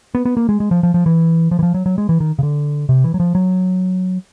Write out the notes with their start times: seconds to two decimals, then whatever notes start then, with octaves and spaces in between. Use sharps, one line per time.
0.15 B3
0.25 B3
0.37 A#3
0.49 G#3
0.60 G#3
0.71 F3
0.83 F3
0.94 F3
1.06 E3
1.51 F3
1.59 E3
1.63 F3
1.74 F#3
1.86 F#3
1.98 G#3
2.09 E3
2.20 D#3
2.39 C#3
2.43 D3
2.89 C3
3.04 E3
3.14 F#3
3.20 F3
3.35 F#3